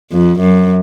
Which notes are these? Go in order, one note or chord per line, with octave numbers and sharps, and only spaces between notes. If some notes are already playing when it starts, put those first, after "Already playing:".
F2
F#2